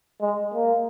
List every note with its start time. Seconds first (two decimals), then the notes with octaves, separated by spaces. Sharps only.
0.21 G#3
0.54 A#3